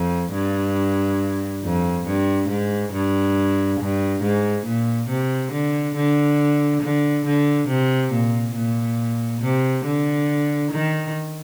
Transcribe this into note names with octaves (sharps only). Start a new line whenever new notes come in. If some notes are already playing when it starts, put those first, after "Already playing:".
Already playing: F2
G2
F2
G2
G#2
G2
G2
G#2
A#2
C3
D3
D3
D3
D3
C3
A#2
A#2
C3
D3
D#3